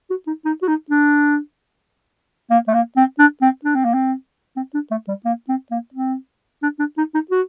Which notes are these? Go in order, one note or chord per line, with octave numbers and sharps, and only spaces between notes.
F#4
D#4
D#4
F#4
D#4
D4
A#3
A3
A#3
C4
D4
C4
D4
C4
A#3
C4
C4
D4
A3
G3
A#3
C4
A#3
C4
D4
D4
D#4
D#4
F#4